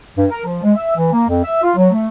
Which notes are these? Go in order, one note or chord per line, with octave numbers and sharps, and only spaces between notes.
G2
A#4
F3
G#3
E5
E3
A#3
F2
E5
F4
F#3
A3